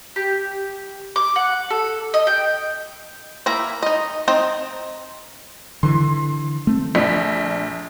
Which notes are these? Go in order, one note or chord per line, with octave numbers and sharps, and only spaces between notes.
G4
D6
F#5
A4
D#5
G5
A#3 E4 A#5
D#4 D#5
C4 D#4
D3 E3 C6
A3 C4
A#1 D4 B6